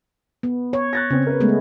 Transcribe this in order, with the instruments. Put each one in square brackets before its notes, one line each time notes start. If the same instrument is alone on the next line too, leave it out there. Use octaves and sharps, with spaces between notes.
[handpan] B3
C#5
[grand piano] F#6 A6 A#6
[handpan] C#3 [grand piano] C4 C#4
[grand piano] A#4 B4
[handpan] G#3 A3 B3